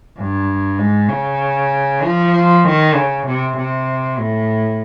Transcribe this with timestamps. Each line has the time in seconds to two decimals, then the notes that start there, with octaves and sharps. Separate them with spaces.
0.17 G2
0.78 G#2
1.09 C#3
2.03 F3
2.64 D#3
2.95 C#3
3.26 C3
3.57 C3
4.19 A2